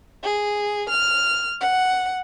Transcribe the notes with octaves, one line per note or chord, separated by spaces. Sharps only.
G#4
F6
F#5